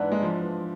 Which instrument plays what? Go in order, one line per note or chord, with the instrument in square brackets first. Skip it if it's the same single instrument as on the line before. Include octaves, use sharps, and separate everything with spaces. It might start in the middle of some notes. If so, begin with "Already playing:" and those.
Already playing: [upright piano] G#2 [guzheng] E3 B3 D4
[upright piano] G#3
F3